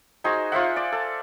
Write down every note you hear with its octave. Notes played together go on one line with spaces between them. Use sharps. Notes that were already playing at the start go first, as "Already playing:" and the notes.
D#4 F#4 G#4 C5
F4 C5 E5 F#5
D5
A4